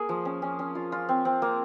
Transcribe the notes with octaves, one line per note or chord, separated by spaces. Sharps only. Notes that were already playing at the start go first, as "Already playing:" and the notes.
Already playing: A#3 G#4
F3
C#4
C#4
C#4
F4
F4
C4
C4
A#3